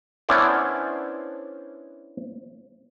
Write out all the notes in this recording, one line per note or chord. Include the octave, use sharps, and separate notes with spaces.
B3 C#4 D4 E4 C5 D5